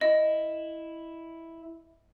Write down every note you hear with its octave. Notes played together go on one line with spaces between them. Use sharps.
E4 D#5